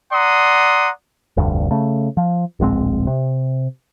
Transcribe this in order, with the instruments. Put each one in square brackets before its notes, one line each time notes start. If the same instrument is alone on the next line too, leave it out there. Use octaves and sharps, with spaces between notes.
[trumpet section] D5 F#5 A#5 C6 D#6
[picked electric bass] F1 D2 G2
C#3 A3
F3
D1 A#1 G#3 C4
C3